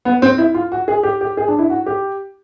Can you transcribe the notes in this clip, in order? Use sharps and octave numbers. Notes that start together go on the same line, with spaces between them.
B3
C4
E4
F4
F#4
G#4
G4
G4
G#4
D4
E4
F#4
G4